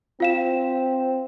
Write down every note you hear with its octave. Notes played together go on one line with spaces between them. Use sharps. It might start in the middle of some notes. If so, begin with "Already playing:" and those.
C4 F4 F5 E7